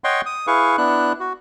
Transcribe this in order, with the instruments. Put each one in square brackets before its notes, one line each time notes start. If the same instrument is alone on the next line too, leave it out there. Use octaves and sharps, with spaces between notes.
[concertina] C#5 D#5 F#5 G5 C6 C#6
D#6
E4 G#4 B4 F5 C#6
B3 D4 E4 F#6
F#4